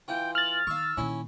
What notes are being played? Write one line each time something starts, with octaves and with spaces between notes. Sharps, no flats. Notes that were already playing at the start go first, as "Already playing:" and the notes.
E3 F4 G5
F6 A6 F#7
D#3 F5 C#6 E6
A#2 D#3 C#4 E4